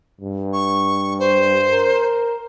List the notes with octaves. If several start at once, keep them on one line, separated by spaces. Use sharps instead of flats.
G2
C#6
C5
A#4